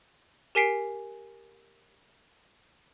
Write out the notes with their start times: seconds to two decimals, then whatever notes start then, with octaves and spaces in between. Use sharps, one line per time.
0.55 G4 A#4 G#5 B6 C7 D7